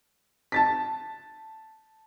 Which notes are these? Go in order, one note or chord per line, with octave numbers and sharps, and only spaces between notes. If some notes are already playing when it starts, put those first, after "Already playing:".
A5 A6 B6